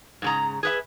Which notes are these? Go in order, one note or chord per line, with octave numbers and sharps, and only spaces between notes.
G#2 C#3 A#5
G#4 B4 E5